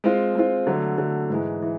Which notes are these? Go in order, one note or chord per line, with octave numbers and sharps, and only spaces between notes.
G#3 C4 F4
G#3 C4 F4
D3 F#3 A3
D3 F#3 A3
G#2 E3 G#3
E3